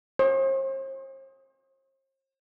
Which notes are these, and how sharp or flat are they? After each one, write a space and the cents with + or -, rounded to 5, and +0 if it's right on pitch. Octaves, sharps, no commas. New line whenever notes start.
C5 +45